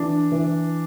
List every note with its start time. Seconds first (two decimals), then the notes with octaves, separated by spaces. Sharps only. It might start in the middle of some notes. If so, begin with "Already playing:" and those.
Already playing: E3 D4
0.32 E3